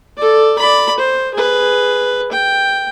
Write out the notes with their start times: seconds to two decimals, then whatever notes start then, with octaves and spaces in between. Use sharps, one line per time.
0.17 A4 D5
0.59 D5 B5
0.98 C5
1.34 G#4 B4
2.32 G5